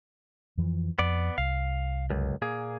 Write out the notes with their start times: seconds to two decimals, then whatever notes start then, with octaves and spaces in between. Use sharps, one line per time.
0.57 F2 E3 F3
0.99 F2 B3 D5
1.38 C2 F5
2.10 C#2 F#2
2.42 A#2 A#3 G#4